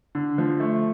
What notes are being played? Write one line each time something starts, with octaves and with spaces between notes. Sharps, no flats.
D3
F3
A3